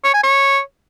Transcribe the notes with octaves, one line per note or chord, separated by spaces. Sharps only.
C#5
G#5
C#5